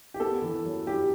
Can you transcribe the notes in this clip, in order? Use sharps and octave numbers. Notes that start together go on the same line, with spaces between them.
G4
B3 A4
E3
F#2
E3 G4